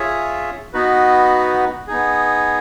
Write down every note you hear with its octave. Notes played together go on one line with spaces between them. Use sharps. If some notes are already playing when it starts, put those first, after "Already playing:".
Already playing: F4 G#4 C#5 E5
B3 D#4 F#4 B4
B3 D#4 G#4